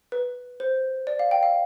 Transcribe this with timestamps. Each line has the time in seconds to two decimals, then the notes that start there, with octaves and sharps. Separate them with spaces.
0.12 B4
0.60 C5
1.07 D5
1.19 F5
1.31 G5
1.43 F5